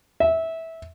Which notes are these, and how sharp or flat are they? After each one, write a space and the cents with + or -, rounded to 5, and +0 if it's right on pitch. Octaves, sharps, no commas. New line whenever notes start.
E5 -15